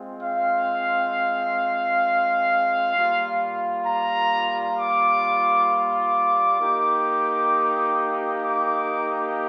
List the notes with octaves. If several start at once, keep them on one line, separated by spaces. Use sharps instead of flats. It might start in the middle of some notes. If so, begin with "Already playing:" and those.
Already playing: G#3 C4 F4
F5
G3 A#3 F4
A#5
D6
D6
A#3 D#4 G4
D6